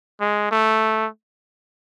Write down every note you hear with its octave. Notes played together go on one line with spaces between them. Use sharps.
G#3
A3